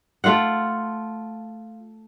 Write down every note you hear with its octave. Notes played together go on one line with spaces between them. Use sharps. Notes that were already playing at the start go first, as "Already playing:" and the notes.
A3 F4 F5 F#5